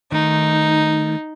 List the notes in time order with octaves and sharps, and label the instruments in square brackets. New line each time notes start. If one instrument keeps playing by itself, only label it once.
[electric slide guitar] D#3 A3 [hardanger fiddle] D#4